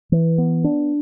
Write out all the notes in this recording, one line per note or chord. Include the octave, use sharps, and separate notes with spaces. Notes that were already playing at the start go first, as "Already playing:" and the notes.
E3
B3
D4